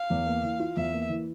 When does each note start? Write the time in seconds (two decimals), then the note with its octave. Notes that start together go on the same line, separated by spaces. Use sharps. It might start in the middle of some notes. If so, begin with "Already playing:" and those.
Already playing: F5
0.10 E2
0.26 A#3
0.43 E3
0.60 F4
0.76 E2 E5
0.93 A#3
1.10 E3